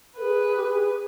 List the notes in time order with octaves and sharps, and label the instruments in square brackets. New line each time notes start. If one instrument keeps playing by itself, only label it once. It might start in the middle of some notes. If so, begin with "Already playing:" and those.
[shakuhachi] A#4 [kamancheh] B4
[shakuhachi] G#4
G4
G#4